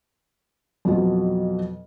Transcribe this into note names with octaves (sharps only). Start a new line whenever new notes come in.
F2 B2 F#3 F4